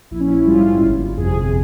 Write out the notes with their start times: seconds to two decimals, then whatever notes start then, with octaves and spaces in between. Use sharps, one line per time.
0.11 A#1 E4
0.20 C#4
0.29 E4
0.47 G#2 G3 F4
0.82 G1
1.17 F2 C3 G#4